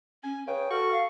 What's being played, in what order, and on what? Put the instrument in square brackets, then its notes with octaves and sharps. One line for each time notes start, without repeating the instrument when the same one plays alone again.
[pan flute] C#4 [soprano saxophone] G#5
[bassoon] C#3 [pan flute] B4 [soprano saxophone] G5
[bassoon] F#4 [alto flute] A4 [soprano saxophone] C#6 [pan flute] F6
[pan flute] F5